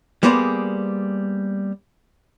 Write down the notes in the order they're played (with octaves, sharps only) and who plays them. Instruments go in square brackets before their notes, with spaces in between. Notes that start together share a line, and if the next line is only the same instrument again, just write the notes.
[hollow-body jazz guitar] G3 A#3 B3 G#4 C5 D5